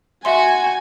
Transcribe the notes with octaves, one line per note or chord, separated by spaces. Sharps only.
F#4 E5 G#5 C6